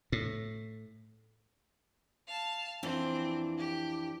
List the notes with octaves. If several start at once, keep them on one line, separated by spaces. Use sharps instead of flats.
A2
F5 A5
F2 E3 C4 D4
G4